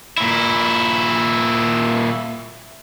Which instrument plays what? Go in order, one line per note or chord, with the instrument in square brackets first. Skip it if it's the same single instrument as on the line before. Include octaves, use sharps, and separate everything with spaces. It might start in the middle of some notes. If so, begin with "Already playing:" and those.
[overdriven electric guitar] A#2 E4